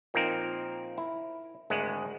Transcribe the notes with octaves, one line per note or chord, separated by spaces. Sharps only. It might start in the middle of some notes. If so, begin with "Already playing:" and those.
A#2 F3 A#3 C4 D#4 A#4
E4
G#1 D2 G#3 F#5